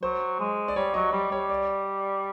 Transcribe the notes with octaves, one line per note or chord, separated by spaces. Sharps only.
F#3 C5
G#3
D5
G3 C#5
F#3 D#5
G3 D5
G3 C#5
D5